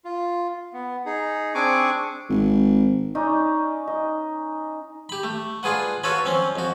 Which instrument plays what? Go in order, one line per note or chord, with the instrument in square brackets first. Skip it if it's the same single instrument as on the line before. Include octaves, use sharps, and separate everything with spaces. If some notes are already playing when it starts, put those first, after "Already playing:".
[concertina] F4
B3
D#4 G#4
C4 D4 G#4 G#5 C#6 D6
[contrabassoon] G#1
[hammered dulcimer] C#4 D#4 D5 D#5
D#4 D#5
[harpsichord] G4 B5
A3
D4 F4 G#4 B4 F#5
F4 F#4 A4 B4 C#5 B5
F3 C4 C#4
F2 F#4